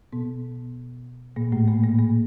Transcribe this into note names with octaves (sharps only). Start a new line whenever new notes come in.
B2 B3
A#2 A#3
A2 A3
A#2 A#3
A#2 A#3
A#2 A#3